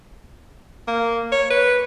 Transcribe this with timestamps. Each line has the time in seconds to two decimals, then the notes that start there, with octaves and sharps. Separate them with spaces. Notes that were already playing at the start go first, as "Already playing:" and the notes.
0.87 A#3
1.32 C#5
1.50 B4